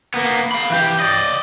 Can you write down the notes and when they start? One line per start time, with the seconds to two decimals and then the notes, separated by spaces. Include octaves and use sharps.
0.14 A#3 B3
0.52 F5 B5
0.70 E3 G4
1.00 D5 D#5